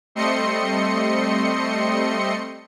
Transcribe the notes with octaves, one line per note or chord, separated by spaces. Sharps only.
G3 A3 C4 D#5 C6 C#7